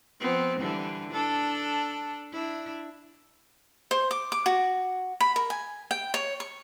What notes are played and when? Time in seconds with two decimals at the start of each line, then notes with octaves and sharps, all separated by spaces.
0.20 F3 B3 C4
0.59 D3 E3 G3
1.11 D4 A4
2.32 D4 E4
3.91 C5
4.11 D6
4.32 D6
4.46 F#4
5.21 B5
5.36 A#4
5.50 G#5
5.91 G5
6.14 C#5
6.40 C#6